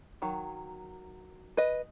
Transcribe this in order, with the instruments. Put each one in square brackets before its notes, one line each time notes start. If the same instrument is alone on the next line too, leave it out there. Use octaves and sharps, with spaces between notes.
[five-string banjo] D#3 F#3
B4 D#5